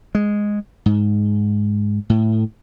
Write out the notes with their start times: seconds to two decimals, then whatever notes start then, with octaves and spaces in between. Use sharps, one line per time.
0.15 G#3
0.86 G#2
2.10 A2